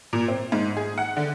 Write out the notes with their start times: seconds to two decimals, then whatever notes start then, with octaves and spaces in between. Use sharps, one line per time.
0.13 A#2
0.28 C4
0.52 G#2
0.77 G#4
0.98 F#5
1.16 D3